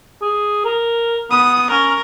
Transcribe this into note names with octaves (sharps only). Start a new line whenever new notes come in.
G#4
A#4
B3 D#6
C#4 A#4